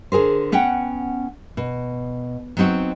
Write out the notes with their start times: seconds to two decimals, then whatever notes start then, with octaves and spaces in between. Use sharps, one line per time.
0.12 D3 G#4 A#4 C5
0.52 B3 C#4 F#5 G5
1.57 B2
2.57 F#3 B3 C4 D#4 F#4